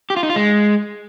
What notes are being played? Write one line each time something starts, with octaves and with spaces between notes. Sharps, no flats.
G4
F4
D#4
F4
G#3